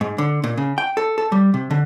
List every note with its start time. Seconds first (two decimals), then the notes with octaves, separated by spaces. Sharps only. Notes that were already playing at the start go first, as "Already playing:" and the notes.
0.01 G#2
0.18 D3
0.44 A#2
0.58 C#3
0.78 G5
0.97 A4
1.18 A4
1.32 G3
1.54 C3
1.71 D3